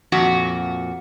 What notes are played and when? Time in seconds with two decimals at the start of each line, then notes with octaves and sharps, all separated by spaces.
0.12 F2 A#2 F#4